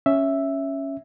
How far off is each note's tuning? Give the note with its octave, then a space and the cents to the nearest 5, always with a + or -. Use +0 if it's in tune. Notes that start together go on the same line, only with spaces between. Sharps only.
C#4 +0 E5 +0